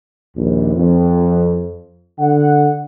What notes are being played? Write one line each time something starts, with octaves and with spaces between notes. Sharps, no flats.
A#1 D#2
F2
D3 F#5